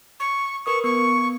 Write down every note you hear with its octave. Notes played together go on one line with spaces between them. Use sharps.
C#6
A#4 B4 C#6 D#6
B3 C#6